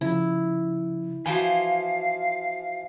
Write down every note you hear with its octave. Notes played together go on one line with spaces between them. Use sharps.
C#3 F3 E4
E3 F3 F#4 C5 F5 G#5